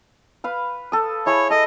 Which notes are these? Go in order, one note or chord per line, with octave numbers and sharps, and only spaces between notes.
B4 F5
A4 D#6
E4 G#4 C#5
A4 D#5